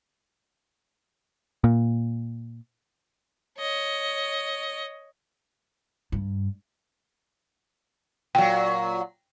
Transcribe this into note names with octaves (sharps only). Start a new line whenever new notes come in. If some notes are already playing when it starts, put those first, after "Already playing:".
A#2
C#5 D#5
G2
A#2 F#3 G5